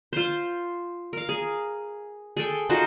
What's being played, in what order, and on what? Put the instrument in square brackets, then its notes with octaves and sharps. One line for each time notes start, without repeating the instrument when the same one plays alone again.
[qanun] F4 C5
A#4 F5
G#4
G#4 A4 G5
D#4 F4 F#4 C5